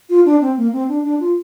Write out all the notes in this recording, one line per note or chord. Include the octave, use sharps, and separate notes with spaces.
F4
D4
C4
A#3
C4
D4
D4
F4